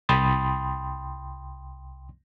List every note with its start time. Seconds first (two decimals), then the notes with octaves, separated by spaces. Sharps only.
0.09 C2 G5 B5 C6 D#6 A6